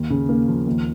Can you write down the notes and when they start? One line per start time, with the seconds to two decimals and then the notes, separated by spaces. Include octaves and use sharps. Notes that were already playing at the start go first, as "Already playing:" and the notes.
Already playing: D#2
0.10 C#3
0.29 A#3
0.48 F3
0.67 D#2